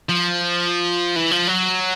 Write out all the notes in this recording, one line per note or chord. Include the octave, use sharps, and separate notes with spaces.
F3
E3
F3
F#3